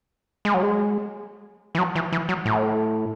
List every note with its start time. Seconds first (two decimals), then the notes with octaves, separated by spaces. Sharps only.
0.45 G#3
0.54 F#3
0.63 G#3
1.75 E3
1.78 F#3
1.95 E3
2.12 E3
2.29 F#3
2.45 A2